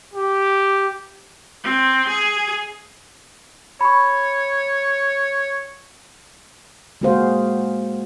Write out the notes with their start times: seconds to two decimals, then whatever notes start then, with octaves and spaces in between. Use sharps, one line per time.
0.14 G4
1.64 C4
2.09 G#4
3.81 C#5 B5 C#6
7.01 G#3 A#3 F#4 G#4 C5 F5